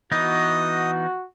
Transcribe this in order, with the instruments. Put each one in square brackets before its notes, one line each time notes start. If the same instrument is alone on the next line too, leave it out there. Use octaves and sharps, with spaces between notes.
[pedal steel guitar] E3 B3 D#4 [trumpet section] F#4 [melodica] D#5 D#6